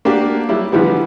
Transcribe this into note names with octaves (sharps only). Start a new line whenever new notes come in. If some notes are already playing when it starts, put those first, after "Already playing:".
A#3 D4 F#4 G4
F#3 G3 E4
D3 E3 F3 G3 B3